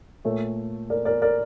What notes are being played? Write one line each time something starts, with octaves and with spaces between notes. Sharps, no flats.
A#2 A3 C#5
A#4 D5
A#4 D5
A#4 D5